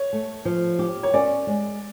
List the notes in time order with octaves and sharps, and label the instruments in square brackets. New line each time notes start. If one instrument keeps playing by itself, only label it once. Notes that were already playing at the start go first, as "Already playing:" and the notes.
Already playing: [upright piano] C#5
[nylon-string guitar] A3
F3
G4
[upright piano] C#5
[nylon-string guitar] C#4 [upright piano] D5
[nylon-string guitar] G#3